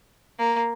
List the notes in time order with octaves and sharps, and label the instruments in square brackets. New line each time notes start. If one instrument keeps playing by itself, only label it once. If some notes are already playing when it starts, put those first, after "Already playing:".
[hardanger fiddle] A#3